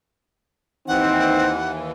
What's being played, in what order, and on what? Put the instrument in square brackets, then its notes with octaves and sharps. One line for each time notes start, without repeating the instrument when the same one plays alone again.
[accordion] D#2 E3 [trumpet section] C4 [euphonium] D#4 [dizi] F#5